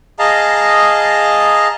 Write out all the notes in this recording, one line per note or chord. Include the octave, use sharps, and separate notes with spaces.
G#4 D#5 F5 A5 A#5